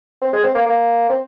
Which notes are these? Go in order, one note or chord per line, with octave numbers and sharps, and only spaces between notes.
C4
G#3
C4
A#3
A#3
C4